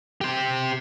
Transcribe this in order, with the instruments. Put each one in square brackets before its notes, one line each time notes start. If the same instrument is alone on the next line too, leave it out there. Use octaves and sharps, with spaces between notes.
[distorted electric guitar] G4 C5